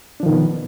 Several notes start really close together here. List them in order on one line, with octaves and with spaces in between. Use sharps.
D4 F3 D#3 B2 B3